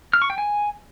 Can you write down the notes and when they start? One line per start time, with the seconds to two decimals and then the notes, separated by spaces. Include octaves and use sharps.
0.13 F6
0.22 C#6
0.30 G5
0.38 G#5